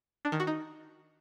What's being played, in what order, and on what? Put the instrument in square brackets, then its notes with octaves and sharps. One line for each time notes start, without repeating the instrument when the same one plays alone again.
[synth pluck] D4
D#3
F#4
D#4